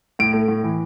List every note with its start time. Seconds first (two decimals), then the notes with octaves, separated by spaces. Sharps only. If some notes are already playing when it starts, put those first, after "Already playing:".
0.19 A2 D7
0.33 A3
0.48 A2
0.64 E3